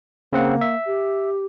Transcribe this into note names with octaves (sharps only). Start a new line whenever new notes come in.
C#3 A#3 C4 F#5
E5
G4